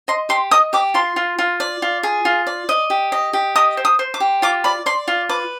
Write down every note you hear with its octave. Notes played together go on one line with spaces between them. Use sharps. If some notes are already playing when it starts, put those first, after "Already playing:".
D#5 C6
G4 C6
D#5 D#6
G4 D6
F4 C6
F4
F4
D5
F4
G#4
F4
D5
D#5
G4
D#5
G4
D#5 D#6
C5
D#6
C5
D6
G4
F4 D6
D5 B5
D5 C6
F4
B4 D6